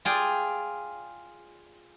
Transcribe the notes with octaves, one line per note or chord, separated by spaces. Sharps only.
F4 G#4 D5 G5